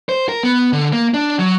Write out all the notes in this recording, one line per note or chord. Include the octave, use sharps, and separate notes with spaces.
C5
A#4
B3
D3
A#3
D4
F#3